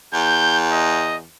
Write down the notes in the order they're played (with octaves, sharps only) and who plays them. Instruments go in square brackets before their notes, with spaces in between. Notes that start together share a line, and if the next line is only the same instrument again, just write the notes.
[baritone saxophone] E2 [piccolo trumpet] G6
[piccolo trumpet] D#5